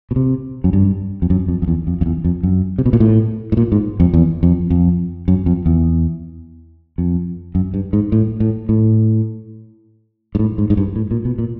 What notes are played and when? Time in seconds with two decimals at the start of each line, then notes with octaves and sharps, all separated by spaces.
0.11 B2
0.16 C3
0.64 F#2
0.73 G2
1.22 F2
1.30 F#2
1.48 F2
1.62 F2
1.68 E2
1.87 F2
2.01 F2
2.06 E2
2.24 F2
2.43 F#2
2.78 C3
2.86 B2
2.93 A#2
3.00 A2
3.52 A2
3.57 A#2
3.72 G#2
4.00 F2
4.14 E2
4.43 F2
4.70 F2
5.28 F#2
5.46 F2
5.66 E2
6.98 F2
7.55 F#2
7.74 G2
7.93 G#2
8.12 A2
8.40 A2
8.69 A2
10.35 G#2
10.39 A2
10.58 G#2
10.70 G#2
10.77 G2
10.96 A2
11.11 A#2
11.25 B2
11.38 A#2